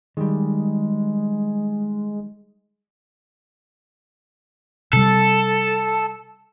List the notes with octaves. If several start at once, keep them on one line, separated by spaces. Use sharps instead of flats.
D#3 G3 G#3
C3 G3 A4